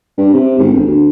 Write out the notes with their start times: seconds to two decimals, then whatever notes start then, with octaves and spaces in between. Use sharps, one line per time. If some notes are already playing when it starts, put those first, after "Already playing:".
0.18 G2
0.34 C3
0.59 G#1
0.73 G1
0.86 D2